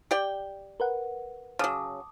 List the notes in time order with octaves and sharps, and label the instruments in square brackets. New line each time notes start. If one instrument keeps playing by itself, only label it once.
[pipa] G4 D5 G5
[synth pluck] A#4 B4 F#5
[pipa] C#3 F#3 [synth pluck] A5 D6 D#6